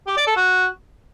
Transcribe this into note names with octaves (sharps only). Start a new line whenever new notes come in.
G4
D5
A4
F#4